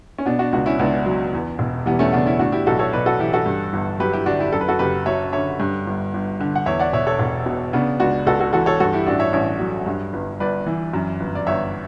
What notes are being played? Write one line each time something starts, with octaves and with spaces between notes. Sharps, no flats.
C#4
B2 B3 D4
D4 F#4
C#2 D4 F#4
C#4 E4
C#2 B3 D4
F#3
E2
E1
E3 G3 B3
A3 C#4
C#3 B3 D4
C#4 E4
A2 D4 F#4
E4 G4
B1 F#4 A4
A4 C#5
B1 B4 D5
F#4 A4
E3 E4 G4
F#4 A4
G2
G1
F#3 G4 B4
E4 G4
D3 D4 F#4
E4 G4
F#2 A4
B4
F#4 A4
F#1 G4 B4
F#3 C#5 E5
D3 C#5 E5
G2
G1
G1
D3
F#5
E2 C#5 E5
D5 F#5
E1 C#5 E5
A4 C#5
E1
B2
C#3 B3 D4
C#2 D4 F#4
C#2 F#4 A4
F#4 A4
E3 F#4 A4
A4 C#5
G2 F#4 A4
E4 G4
A1 D4 F#4
C#5 E5
A1 C#5 E5
F#3
G2
G1
G1 B4 D5
E3
F#2
G1
D5
G1 C#5 E5